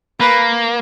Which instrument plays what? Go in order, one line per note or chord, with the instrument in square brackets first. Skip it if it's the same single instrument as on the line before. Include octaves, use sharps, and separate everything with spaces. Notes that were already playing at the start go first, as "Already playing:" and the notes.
[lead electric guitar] A#3 [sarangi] B4